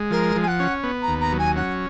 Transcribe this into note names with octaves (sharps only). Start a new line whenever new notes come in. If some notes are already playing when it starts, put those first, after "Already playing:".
Already playing: G#3
F3 A#4
F3
G#5
F#5
C#4
B3
A#5
D#2
A#5
F#3
G#5
C#4 F#5